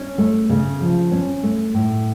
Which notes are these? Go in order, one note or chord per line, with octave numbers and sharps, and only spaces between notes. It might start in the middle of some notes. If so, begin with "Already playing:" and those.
Already playing: C#4
A3
C#3
F3
C#4
A3
A2